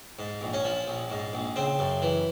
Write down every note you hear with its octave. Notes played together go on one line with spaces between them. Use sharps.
G#2
A#1
C#4
F3
A#1
G#2
A#1
C#3 C4
F#2
E3